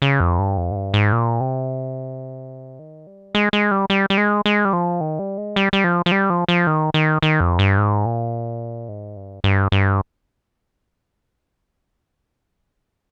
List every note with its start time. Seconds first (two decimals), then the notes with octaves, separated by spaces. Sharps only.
0.02 C#3
0.20 F2
0.39 G2
0.57 F2
0.71 G#2
0.76 G2
0.94 G#2
1.12 A#2
1.40 C3
2.79 D#3
3.07 G3
3.35 G#3
3.53 G#3
3.71 G3
3.90 G3
4.10 G3
4.18 G#3
4.46 G#3
4.65 G3
4.73 F3
5.01 D#3
5.19 G3
5.38 G#3
5.56 G3
5.73 G3
5.84 F3
6.06 F3
6.12 G3
6.30 F3
6.48 F3
6.67 D#3
6.94 D#3
7.22 D#3
7.40 F2
7.59 G2
7.78 G#2
8.06 A#2
8.89 G#2
9.16 G2
9.44 G2
9.72 G2